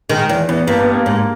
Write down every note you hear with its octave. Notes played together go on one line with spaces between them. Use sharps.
D#3 G#3
E2
E2 B3
G2 A#3
B3
A#3
G#2